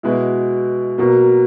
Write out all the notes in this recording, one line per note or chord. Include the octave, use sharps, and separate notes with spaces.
B2 G#3 B3 E4
B2 F#3 A#3